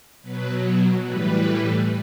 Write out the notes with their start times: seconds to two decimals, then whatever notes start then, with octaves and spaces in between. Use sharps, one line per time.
0.22 B2 F#3 B4
1.02 A2 E3 G3 B4